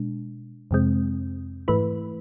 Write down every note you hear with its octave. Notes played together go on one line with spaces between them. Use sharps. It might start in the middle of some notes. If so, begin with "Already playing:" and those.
Already playing: B2 G#3 D4
F2 C3 G#3 C4
G#2 E3 A3 E4 B4